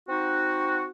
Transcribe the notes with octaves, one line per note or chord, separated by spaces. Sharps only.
C4 D#4 F#4